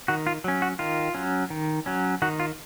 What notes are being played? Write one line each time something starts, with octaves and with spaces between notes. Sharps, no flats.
D#3 F#4
F4
F#3 C#4
F#4
D#3 F4
F#3 C#4
D#3
F#3 C#4
D#3 F#4
F4